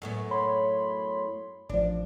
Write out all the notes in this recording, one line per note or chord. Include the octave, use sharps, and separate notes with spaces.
F#2 A2 B3
C#5 B5 C6
A1 F3 D4